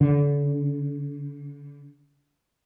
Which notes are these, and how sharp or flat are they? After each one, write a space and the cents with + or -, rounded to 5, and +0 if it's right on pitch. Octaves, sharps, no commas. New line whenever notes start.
D3 -35